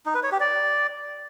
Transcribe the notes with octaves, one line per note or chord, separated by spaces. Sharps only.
D#4
B4
C#5
G4
D5